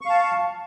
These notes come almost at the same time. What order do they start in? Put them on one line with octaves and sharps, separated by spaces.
C#6 F5 A5